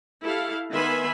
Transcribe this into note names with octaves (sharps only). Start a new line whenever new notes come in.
E4 G4 A4 F5
D#3 B3 E5 G#5 B5 C6